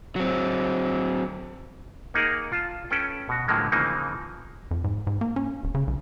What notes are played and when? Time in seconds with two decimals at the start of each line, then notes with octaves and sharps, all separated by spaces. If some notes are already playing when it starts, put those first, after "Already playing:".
0.16 F#3 C4
2.14 A#3 D#4 G#4 A#4 F#5
2.52 F4 A5
2.90 C#4 A4 B4 G5
3.29 B2 F#4
3.48 A2 D3 F3 F#3 G#3 A#3
3.72 C#3 E3 F3 A#3 C4 D#4
4.71 F2
4.84 G#2
5.07 G#2
5.21 A#3
5.36 C#4
5.63 D1
5.75 C#3
5.87 B1